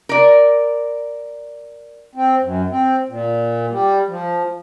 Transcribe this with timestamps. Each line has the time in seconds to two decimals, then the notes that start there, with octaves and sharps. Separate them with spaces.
0.09 A#4 D5
2.15 C4
2.42 F#2
2.71 C4
3.09 A#2
3.71 G3
4.08 F3